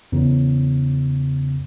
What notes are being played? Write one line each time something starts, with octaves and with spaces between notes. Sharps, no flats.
E2 C#3